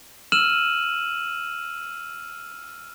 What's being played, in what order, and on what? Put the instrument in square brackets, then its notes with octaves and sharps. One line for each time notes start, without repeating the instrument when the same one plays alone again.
[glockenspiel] E6 F6 D#7 E7 F#7